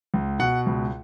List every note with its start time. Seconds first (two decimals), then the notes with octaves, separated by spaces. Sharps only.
0.14 C#2
0.39 B2 F#5
0.66 C#2